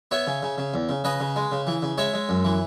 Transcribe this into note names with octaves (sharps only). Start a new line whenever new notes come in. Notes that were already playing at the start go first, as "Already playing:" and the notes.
B3 C#5 E5
C#3
C#3
C#3
E2
C#3
C#3 B4 D#5
C#3
G#3
C#3
E3
C#3
G#3 C#5 E5
G#3
F#2
E3